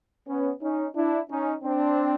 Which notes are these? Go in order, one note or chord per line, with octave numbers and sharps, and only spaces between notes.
B3 C#4
C#4 D#4
D4 E4
C#4 D#4
C4 D4